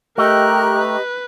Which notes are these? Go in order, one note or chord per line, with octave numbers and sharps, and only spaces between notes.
A3 G4 A#4 D#5 A#5 F#6
B4